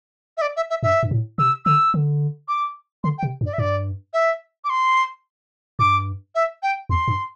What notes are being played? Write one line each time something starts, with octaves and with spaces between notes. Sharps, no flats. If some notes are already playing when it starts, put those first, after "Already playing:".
E5
D5
E5
E5
G2 E5
G2
A2
C3 E6
D3 E6
D3
D6
D3 C6
G5
C3
G2
D5
E5
G2 D5
E5
D6
C6
G2 D6
E5
G5
E2 C6
G2